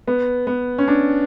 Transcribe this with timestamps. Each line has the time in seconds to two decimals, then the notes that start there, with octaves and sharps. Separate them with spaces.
0.07 B3
0.47 B3
0.78 C#4
0.88 D4